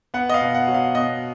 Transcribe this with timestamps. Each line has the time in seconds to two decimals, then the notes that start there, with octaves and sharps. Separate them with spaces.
0.14 B3 F#5
0.29 D#5
0.34 F5
0.41 B2
0.55 F#5
0.68 F#3
0.74 F5
0.95 B2 D#5